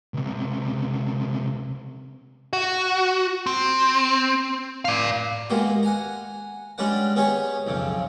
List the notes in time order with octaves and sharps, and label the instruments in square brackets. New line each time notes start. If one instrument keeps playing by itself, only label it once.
[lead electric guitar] C#2 C3
F#4
C4
D5 F5
[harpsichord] G#3 A#3 B3 F#4 G4
F#5 G#5 A#5
G3 G#3 C#4 D4 B4 F#5
B3 C#4 G4 G#4 C#5 C#6
B1 F2 C#3